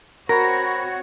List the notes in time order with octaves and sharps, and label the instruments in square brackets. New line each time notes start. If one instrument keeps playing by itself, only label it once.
[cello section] C4 F#4 [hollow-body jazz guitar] A#4 [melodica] C#5 F#5 [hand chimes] B5 A#6